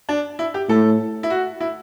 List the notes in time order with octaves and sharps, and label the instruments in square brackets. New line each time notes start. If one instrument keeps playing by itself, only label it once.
[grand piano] D4
E4
G4
[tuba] A2 [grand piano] A4
[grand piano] E4
F#4
E4